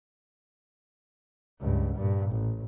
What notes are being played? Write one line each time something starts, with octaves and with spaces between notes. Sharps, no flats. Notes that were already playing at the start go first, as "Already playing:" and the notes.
C#2 G2
G2 A#2
A1